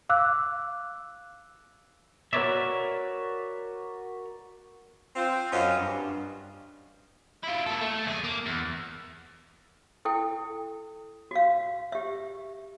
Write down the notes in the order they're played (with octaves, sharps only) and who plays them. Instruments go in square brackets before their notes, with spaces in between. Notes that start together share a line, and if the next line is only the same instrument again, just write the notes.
[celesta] F5 D6 E6 F#6
[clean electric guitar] F#4 A#4 B4 C#5 D5 E5
[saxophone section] C4 F4
F#2 C#4 F4 F#4 C5 D#5
G2
[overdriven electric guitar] E4 F4
A#3 A4
A3
D#2 G#4
A#3
E2
[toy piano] E4 A4 G5
F#4 F5
G4 E5